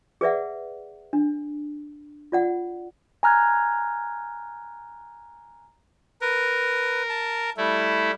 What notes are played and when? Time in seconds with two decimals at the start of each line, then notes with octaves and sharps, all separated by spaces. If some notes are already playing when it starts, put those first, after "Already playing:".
0.21 G#4 B4 D5 E5 F#5
1.13 D4
2.32 F4 D5 F#5
3.23 G#5 A#5 F6 F#6 G#6
6.21 A#4 B4
7.09 A5
7.57 G3 A3 E4